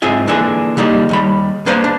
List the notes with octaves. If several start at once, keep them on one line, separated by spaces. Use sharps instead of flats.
G#2 C4 F4 G#4 E5
D3 E3 A#3 D4 G#4
D3 G3 A#3 D#4
D#2 G3 B5
A#3 D4 B4 C5 F5
D4